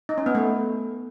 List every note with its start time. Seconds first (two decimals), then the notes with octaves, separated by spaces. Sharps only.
0.09 D#4
0.18 C#4
0.26 B3
0.35 A3